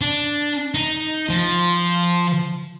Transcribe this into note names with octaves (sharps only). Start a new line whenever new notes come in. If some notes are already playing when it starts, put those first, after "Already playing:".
D4
D#4
F3